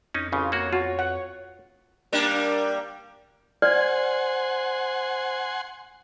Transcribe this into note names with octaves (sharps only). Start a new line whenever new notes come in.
F2 C#4 D#4
A1 C#3 F4
A#3 F#4 C#5
F4 F#4
F#5
G3 A#3 D4
C5 D5 F#5 G#5 C6 F6 G#6